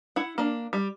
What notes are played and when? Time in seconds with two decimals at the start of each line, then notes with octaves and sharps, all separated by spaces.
0.16 E4 F#5
0.38 A#3 D4
0.73 G3